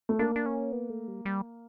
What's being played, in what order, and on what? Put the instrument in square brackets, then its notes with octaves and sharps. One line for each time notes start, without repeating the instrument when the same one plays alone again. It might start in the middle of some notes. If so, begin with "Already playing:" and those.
[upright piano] A3
[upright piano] A#3 [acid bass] D4
[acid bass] D4
C#4
B3
A3
G3
G3